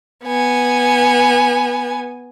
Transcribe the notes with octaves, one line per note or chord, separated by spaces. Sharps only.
B3 G#5